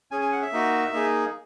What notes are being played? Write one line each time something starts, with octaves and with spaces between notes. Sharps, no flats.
C#4 G#4 G#5
G#5
F#5
E5
A#3 D#4 F#4
A#3 D#4 G#4